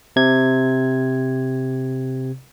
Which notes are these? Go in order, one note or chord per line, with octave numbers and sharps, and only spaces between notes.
C3 G#6